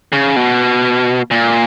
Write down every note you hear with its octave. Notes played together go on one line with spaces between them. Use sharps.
C#3
B2
A#2